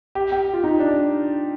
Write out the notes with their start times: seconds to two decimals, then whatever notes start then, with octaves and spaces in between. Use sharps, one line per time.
0.15 G4
0.32 G4
0.53 F4
0.64 D#4
0.80 D4